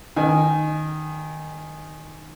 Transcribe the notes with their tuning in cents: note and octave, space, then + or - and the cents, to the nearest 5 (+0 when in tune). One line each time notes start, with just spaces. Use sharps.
D#3 -10 G#5 +0